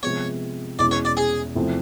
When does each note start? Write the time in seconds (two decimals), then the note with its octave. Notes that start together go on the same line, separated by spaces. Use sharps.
0.03 C3 F3 G#3 B3 C#5
0.79 E2 B2 G#3 C#4 E4 D5
0.91 C#5
1.05 D5
1.17 G#4
1.55 E2 C3 F3 A3 C4